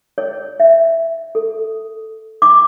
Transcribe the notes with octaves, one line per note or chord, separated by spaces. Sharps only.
C#5
E5
A4
D6